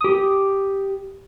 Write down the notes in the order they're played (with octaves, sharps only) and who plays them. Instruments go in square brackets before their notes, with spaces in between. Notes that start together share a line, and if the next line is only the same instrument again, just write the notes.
[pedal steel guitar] G4 D#6